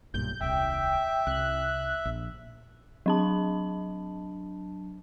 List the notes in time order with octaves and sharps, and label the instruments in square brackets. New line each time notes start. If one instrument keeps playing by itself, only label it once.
[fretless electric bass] B1 G2 A#2 [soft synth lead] G6
[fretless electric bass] D#1 C2 [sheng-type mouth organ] E5 [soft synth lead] G5
[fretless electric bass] C2 [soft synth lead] F#6
[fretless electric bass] A#1
[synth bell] F#3 D4 A5